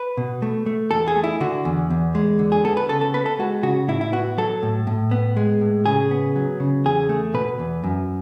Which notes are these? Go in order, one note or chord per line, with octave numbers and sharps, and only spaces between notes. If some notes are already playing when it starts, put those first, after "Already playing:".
Already playing: B4
B2
A3
A3
E2 A4
G#4
A3
E4
D3 F#4
E2
E2
G#3
D3
G#4
B3 A4
B4
C#3 A4
A4
B3 B4
A4
G#3 F#4
C#3 F#4
A2 E4
E4
B3 F#4
F#3 A4
A2
A2
B3
G#3
A2
C#3 G#4
B3
F#3
C#3
E2 G#4
A3
B2 B4
E2
F#2